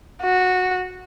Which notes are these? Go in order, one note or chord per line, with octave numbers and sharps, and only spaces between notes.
F#4